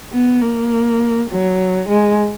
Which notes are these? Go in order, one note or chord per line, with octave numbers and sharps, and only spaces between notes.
B3
A#3
F#3
G#3